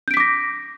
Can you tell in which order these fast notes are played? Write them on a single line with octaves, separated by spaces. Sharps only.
G6 D7 B6 D6 A#6